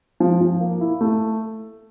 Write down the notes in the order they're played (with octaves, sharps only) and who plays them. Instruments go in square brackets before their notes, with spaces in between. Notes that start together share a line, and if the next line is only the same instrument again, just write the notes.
[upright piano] F3
F3
A#3
E4
A3